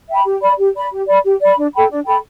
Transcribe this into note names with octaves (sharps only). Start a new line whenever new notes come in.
E5 G5 B5
G4
D5 B5
G4
D5 B5
G4
D5 B5
G4
D5 B5
D4
A4 G5 B5
D4
A4 G5 B5